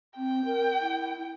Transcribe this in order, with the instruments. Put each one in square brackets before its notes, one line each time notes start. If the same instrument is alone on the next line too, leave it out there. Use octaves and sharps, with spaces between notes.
[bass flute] C4 [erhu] G5
[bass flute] A#4
E4